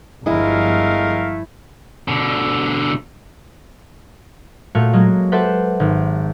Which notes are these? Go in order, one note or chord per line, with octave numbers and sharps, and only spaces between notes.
G1 F3 G#3 A3 E4 A#4 F5
B2 D3
A#2 A3 F#4 C#5 F5 C#7
F#3 G#3 A#3
G4 A4 B4 C5 E5 F#5
G#1